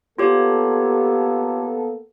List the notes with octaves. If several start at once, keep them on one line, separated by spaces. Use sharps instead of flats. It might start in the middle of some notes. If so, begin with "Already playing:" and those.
A#3 B3 F4 G4 A4 C#5